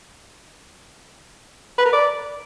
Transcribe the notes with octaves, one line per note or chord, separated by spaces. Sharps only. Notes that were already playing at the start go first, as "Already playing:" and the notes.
B4
A#4
D5